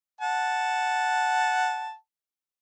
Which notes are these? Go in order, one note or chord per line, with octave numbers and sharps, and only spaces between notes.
F#5 A5